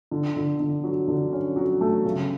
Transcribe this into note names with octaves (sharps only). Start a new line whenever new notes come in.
D3
D3
D3
F#3
D3
C#4
F#3
A3
C#3